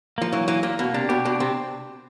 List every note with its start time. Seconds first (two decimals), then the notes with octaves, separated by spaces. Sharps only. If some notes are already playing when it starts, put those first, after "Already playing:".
0.18 F3 A#3
0.33 E3 F#3
0.48 E3 A#3
0.63 A#2 A#3
0.79 B2 A#3
0.94 C3 D4
1.09 B2 G4
1.25 B2 D4
1.40 C3 C4